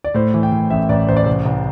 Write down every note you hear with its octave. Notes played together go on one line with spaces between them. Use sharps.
D5
A2 C5
E3
G5
A2
A1 E5
A1 D5
A1 C5
D5
C2 C5
C2